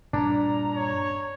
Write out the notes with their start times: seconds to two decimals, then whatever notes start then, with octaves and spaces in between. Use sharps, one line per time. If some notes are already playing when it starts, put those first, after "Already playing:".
0.13 G2 A#2 D4 A#5
0.74 C#5